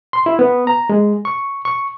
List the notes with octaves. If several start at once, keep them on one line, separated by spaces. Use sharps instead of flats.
C6
E4
B3
A#5
G#3
C#6
C#6